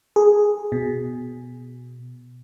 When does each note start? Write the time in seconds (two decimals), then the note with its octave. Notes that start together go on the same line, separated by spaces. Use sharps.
0.16 G#4
0.72 B2